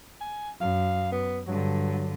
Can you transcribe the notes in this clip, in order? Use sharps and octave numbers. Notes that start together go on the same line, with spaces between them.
G#5
F#2 F5
B3
G2 D3 F#3